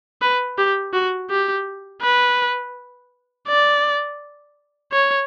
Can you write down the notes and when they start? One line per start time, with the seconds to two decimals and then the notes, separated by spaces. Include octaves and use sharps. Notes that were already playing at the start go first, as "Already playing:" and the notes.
0.22 B4
0.58 G4
0.94 F#4
1.30 G4
2.02 B4
3.48 D5
4.92 C#5